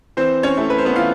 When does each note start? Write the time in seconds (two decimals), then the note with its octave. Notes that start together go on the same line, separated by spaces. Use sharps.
0.17 E3 C4 C5
0.43 C#4 C#5
0.57 A3 C4 E4
0.70 B4
0.78 C5
0.85 B3 B4
0.96 E3 F4 F5